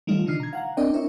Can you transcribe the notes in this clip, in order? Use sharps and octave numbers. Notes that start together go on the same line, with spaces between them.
D#3 E3 G3 A3 D#4 F4
B2 D3 D4 D#4 F6 C7
A#5 G#6
F5 F#5 A#5
C4 D4 A#4 D5 D#5 G5
D4 E4 A#4 C#5 E5